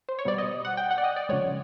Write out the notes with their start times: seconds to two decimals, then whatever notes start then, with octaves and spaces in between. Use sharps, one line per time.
0.09 C5
0.19 C#5
0.25 B2 G3 D5
0.38 D#5
0.65 F#5
0.77 G5
0.91 F#5
0.98 D5
1.04 D#5
1.16 D5
1.29 C#3 F3 G#3 C#5